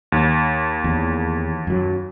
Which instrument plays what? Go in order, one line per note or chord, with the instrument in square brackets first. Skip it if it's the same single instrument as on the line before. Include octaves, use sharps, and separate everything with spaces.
[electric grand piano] D#2
[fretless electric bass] E2
F#2 F#3